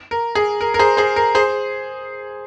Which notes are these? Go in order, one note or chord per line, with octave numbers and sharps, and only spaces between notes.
A#4
G#4
A#4
A#4
G#4 C5
G#4 C5
A#4
G#4 C5